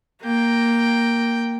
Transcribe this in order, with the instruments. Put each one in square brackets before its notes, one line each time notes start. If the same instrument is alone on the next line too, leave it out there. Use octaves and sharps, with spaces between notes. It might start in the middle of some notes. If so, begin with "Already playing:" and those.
[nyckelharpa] A#3 G5